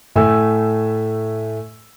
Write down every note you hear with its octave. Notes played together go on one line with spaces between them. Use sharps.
A2 A3 A4 E5 G#5 E6